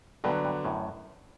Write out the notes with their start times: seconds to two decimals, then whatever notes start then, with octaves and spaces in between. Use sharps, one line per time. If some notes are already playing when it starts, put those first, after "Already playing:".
0.24 G2 B2 D3 F#3 B3
0.45 G2
0.65 F#2 A2